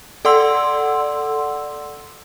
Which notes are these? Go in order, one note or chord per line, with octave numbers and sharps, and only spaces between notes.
A4 D5 F#5 C6 E6